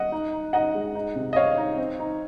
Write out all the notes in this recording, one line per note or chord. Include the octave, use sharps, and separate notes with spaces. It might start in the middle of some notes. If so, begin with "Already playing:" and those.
Already playing: D#5 F#5
D#4
D#4
D#4 D#5 F#5
G#3
D#4
C3
D#5
C4 C#5 F5
D#4
C4
D#4